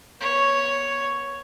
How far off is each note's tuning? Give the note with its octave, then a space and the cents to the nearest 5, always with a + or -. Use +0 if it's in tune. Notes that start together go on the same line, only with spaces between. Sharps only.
B3 -30 C#5 +0